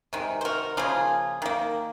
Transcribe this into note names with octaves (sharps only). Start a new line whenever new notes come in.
C3 D#3 G#3
C5
F#4 A#4
C#3 F3 A#3 F4 G#4
D#3 A#3